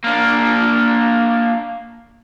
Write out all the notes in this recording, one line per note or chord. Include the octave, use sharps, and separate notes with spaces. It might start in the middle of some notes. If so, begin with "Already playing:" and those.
A#3 D4